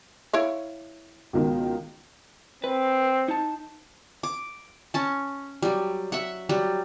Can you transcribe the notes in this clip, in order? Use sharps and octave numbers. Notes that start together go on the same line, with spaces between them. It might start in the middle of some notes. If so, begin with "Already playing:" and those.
E4 C#5 F5
C#2 B2 D#3
C4 B4
D#4 A5
D6
C#4 A5
F#3 G3
E5 F#5
F#3 G3